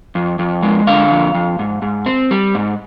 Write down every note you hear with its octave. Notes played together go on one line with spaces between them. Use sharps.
F2
F2
G#3
D3 F5
F2
F2
G#2
G#2
C4
G3
G#2